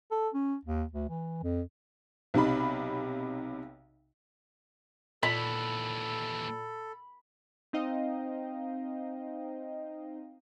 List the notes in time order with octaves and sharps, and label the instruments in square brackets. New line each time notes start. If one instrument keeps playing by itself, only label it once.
[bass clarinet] A4
C#4
D#2
D2
E3
F2
[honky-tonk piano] B1 C3 D#4 B5
[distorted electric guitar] D#2 E3 [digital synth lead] A#2 [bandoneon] A4 [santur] B5
[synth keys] C4 D#4 C5 D#5 F5 G5